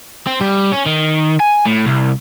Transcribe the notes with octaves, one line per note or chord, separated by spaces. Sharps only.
C4
G3
C#4
D#3
G#5
A2
C2